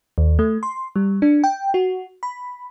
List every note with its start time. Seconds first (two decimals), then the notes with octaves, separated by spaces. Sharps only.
0.18 D#2
0.39 A3
0.63 C6
0.96 G3
1.22 D4
1.44 G5
1.74 F#4
2.23 B5